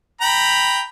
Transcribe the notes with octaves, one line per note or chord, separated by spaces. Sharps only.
G5 A#5 B5